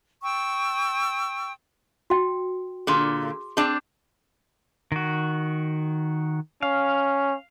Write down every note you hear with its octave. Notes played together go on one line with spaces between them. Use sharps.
G5 C#6 E6
F#4 G5
A#2 D3 G#4 C6 D6
C4 D4 G#4 D5 A5
D#3 F#4
C#4 F5